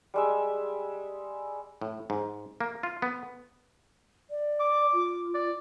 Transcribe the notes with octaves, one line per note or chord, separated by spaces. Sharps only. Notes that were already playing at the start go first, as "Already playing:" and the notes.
G3 G#3 E5
A2
G#2
A#3
F4
B3
D5
D6
F4
D5